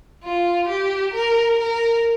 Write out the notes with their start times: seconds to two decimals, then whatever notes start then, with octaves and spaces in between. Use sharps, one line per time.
0.24 F4
0.69 G4
1.14 A#4
1.59 A#4